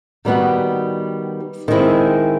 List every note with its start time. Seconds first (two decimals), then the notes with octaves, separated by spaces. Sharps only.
0.25 D#3 G3 B3 D#4 F#4
1.68 D#3 G#3 C4 E4